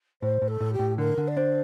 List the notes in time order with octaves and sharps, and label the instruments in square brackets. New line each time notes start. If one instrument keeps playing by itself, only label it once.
[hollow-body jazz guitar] A2 [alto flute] C5
[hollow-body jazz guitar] A2
[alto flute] A4
[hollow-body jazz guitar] A2
[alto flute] G4
[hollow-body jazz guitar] A2
[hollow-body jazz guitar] D3 [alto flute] A#4
[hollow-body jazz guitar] D3
[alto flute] D5
[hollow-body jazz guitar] D4 [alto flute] C5